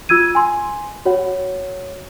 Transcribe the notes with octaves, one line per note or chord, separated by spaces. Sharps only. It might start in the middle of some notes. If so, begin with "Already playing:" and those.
F4 E6 G#6 D#7
G#5 C6
F#4 C#5 F#5